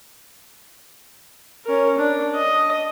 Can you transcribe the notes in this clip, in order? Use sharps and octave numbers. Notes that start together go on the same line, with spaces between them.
C#4 A#4
D4
D#5